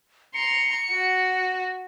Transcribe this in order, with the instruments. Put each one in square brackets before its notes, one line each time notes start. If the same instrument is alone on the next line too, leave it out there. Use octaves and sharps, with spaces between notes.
[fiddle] A#5 C6 [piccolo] C#7
[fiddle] F#4